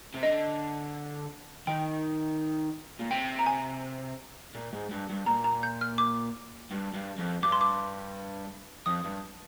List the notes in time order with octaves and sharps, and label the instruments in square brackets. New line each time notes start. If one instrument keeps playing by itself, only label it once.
[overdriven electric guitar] C3
[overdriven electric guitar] D3 [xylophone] D#5
[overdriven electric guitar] D#3 [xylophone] G5
[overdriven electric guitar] A#2
[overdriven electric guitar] C3 [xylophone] G5
[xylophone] A#5
G#5
[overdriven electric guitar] A#2
G#2
G2
G2
[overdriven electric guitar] A#2 [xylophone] A#5
[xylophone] A#5
G6
F6
D6
[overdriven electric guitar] G2
G2
F2
[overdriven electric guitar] G2 [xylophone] D6
[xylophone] C6
D6
[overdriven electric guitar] F2 [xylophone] D#6
[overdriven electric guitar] G2